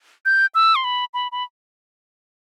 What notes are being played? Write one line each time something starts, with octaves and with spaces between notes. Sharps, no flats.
G6
E6
C6
B5
B5
B5